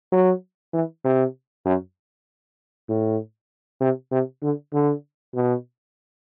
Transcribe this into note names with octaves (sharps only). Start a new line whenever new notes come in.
F#3
E3
C3
F#2
A2
C3
C3
D3
D3
B2